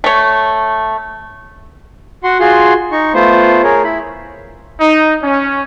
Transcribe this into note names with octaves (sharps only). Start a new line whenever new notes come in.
A3 C#5
F#4 F#5 C6
F4 F#4 G#4 C6
D#4 C#6
A3 B3 F4 C5
G#4 A#4 C#5
E4 B5
D#4
C#4